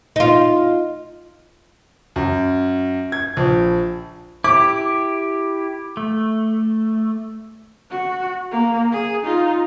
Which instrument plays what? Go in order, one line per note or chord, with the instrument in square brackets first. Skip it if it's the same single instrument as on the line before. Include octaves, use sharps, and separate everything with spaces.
[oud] D#4 F4
[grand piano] F#2
G#6
A#1
[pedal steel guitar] E4 G4 [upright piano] D6
[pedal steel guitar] A3
[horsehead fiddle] F#4
A#3
G#4
D#4 F4